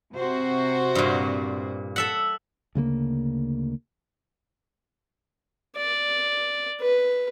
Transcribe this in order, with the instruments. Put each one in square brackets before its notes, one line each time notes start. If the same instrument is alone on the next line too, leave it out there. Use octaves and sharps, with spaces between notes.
[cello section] C3 F#4 C5
[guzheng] G2 A#2
A4 E5 F#5
[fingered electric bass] D2 C#3 G3 A#3
[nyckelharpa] D5
B4